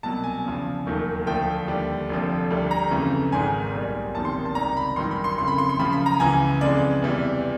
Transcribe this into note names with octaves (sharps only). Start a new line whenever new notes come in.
C2 B2 F#3 A5
G#5
E2 C#3 F3
E1 D#2 D#3 F#3 A3
D2 D3 F3 A3 G5
D#2 D3 G3
F1 F2 D3 F3
D2 D3 G3
A#5
F2 C#3 E3 A3
G#1 G#2 D#3 G#3 G#5
B1 A#2 G3
F#1 E2 C3 D#3 A5
C6
A5
C#2 C3 D#3 G3 A#5
B5
A1 G2 D#3 F#3 C6
B5
C6
F#1 F2 C#3 C6
B5
C6
C6
F#2 C#3 F3 B5
B5
A#5
C#2 C#3 E3 G#5
F2 C#3 E3 G#3 D5
E2 C3 E3 G3